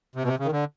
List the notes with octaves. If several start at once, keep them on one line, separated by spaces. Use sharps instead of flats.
C3
B2
C3
C#3
D#3
D3